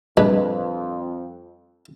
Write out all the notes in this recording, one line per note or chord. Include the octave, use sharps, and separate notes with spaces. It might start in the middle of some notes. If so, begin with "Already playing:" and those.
F2 A#2 G3 G#3 D4 B4